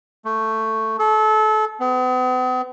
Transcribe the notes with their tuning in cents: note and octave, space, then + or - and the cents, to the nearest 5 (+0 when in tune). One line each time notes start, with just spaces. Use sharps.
A3 +10
A4 -30
B3 +45